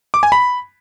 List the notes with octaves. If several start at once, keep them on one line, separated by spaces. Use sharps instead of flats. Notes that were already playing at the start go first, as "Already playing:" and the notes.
D6
G#5
B5